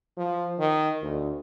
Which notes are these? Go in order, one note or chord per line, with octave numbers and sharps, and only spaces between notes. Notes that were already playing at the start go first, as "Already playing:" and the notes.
F3
D#3
D2